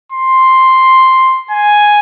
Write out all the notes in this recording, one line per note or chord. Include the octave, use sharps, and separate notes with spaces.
C6
G#5